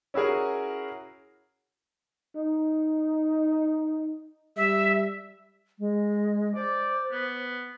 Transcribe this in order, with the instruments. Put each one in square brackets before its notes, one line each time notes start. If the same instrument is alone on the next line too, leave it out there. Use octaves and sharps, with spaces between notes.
[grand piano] C#4 E4 F#4 G#4 A#4
[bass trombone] D#4
[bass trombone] G3 [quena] E5
[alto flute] G#3
[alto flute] C5 [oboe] D5
[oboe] B3